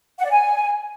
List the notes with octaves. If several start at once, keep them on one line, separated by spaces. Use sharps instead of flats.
F#5
D5
G#5